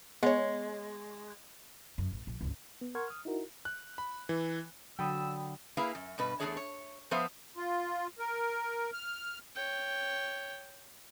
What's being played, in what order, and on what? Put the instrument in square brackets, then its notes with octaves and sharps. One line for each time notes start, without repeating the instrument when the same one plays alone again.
[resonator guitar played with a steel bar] G#3 [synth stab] B3 C#5
[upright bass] F#2
A1
A#1
G#1 C#2
[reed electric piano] B3
A#4 F#5 C6 C#6 F6 G#6
D#6 F6
D#4 E4 F#4 A#4
[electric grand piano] F#6
B5
E3
[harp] D3 [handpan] F#3 [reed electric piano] G5 B5 D#6 [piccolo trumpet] E6
[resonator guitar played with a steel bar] A#3 E4 G#4 A#4 B4 F5
F#2
G2 B2 B4
E2 G#3 A3 D4 G#4 C#5
C#5
F3 B3 B4 C5 E5 F5
[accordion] F4
A#4
F6
[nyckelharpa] C#5 G5